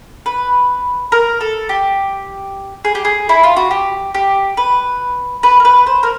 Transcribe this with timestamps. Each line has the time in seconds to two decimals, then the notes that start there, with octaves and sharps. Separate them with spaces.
0.26 B4
1.12 A#4
1.41 A4
1.69 G4
2.85 G#4
2.95 G4
3.05 G#4
3.29 E4
3.43 F4
3.56 F#4
3.71 G4
4.15 G4
4.57 B4
5.43 B4
5.60 A#4
5.65 B4
5.86 C5
6.03 A#4